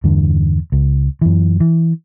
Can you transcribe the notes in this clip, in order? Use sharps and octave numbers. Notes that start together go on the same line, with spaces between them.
E2 G2 D3
C#2
F#2 E3
E3